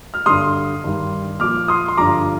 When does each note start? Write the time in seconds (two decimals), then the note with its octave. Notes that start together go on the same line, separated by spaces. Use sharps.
0.14 F6
0.26 G2 D3 G3 C6 D#6
0.84 G2 D#3 G3
1.40 A#2 F3 D6 F6
1.68 C6 D#6
1.88 C6
1.97 G2 D3 F3 A#5 D6